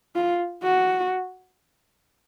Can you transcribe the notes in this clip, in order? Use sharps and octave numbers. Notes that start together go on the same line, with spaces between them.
F4
F#4